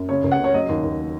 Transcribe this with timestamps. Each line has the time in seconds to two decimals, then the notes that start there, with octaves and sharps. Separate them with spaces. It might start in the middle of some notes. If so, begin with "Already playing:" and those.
Already playing: F#2
0.09 C#3 C#5
0.23 C#2
0.31 F#5
0.39 C#3
0.44 C#5
0.53 F#3 D#5
0.69 D#2
0.83 D#2